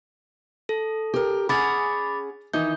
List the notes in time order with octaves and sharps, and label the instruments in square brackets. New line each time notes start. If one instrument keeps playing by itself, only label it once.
[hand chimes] A4
[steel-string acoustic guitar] G4 A#4
[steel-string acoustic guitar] C#4 G#4 F#5 [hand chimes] B5 D6 A6
[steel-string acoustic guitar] D#3 E3 D#4 [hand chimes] G6